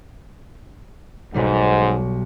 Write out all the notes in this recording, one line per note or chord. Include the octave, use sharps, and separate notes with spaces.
B1 G#2 B2 G3